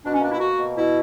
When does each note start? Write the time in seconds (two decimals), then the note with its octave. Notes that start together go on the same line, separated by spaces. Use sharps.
0.04 B2 D4
0.13 C#4
0.22 A#3 D4
0.31 E4
0.39 A#3 F#4
0.57 B2
0.75 B2 E4